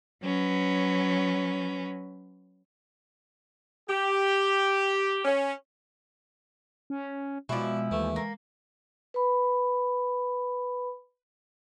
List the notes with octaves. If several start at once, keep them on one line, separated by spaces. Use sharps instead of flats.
F#3 C#4 B4
G4
C#4
C#4
B2 F3 G#3 E4 F#4 D5
D#2 E3 A3
A#3
B4 B5